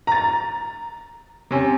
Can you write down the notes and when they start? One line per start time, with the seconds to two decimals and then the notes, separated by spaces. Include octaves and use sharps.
0.07 A#5 A6
1.51 C3 C#4